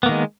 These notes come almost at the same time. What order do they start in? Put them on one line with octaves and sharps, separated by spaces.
B3 A#3 D#3 G#3